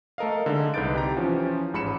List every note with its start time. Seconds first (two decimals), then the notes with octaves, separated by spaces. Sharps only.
0.18 A3 A4 A#4 D#5 F5
0.46 D3 G#3 D#4
0.74 C2 D#4 B4 G6 A6 D7
0.95 G4 A#5
1.16 E3 F3 C#4
1.73 A1 G#2 B5 C#7 E7